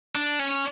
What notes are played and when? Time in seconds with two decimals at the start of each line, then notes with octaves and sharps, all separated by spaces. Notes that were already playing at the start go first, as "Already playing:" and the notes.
0.15 D4
0.39 C#4